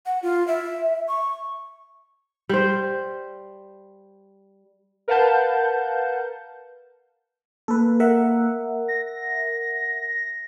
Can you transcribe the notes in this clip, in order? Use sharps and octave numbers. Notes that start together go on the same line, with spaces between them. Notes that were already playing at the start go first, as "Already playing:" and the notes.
F#5
F4
E5
C#6
G3 C5
A#4 B4 F5 F#5 A5 G6
A#3 A4 B4
A#4 E5 F#5
A#6